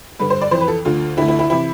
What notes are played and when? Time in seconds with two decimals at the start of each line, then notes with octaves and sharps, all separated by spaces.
0.19 G2 D3 B4
0.30 C5
0.42 D5
0.51 F2 E3 C5
0.61 B4
0.68 A4
0.85 D2 D3 F4
1.17 D3 E4
1.21 D2
1.28 E4
1.39 E4
1.50 C3 E3 E4